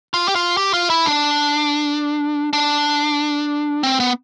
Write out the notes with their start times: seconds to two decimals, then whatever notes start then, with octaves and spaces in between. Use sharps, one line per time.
0.14 F4
0.28 G4
0.36 F4
0.57 G4
0.74 F4
0.90 E4
1.06 D4
2.53 D4
3.83 C4
4.00 B3